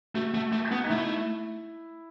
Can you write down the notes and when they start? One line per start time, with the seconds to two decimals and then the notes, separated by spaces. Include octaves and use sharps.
0.15 A3 F#4
0.34 A3
0.52 A3
0.72 B3
0.83 D#4
0.90 A3 E4